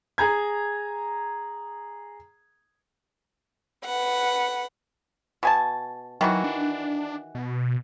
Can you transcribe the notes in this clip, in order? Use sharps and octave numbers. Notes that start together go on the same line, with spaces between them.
G#4 A#5 G#6
B4 F#5
B2 G#5 A5
D#3 E3 F#3 F#4
D4
B2